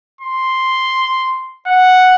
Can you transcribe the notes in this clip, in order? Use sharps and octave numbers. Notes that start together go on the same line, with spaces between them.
C6
F#5